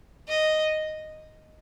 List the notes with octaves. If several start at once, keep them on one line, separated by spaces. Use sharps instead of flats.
D#5